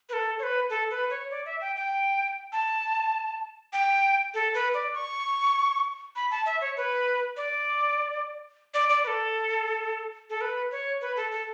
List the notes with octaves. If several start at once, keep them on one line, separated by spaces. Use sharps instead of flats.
B4
A4
C#5
B4
A4
B4
C#5
D5
E5
G5
G5
A5
G5
A4
B4
D5
C#6
B5
A5
E5
C#5
B4
D5
D5
D5
B4
A4
A4
B4
C#5
B4
A4
A4